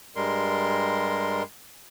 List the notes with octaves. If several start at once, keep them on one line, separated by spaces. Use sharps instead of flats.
G2 G3 G#3 A#4 C6